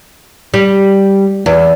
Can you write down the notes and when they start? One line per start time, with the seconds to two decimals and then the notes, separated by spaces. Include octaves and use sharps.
0.54 G3
1.46 E2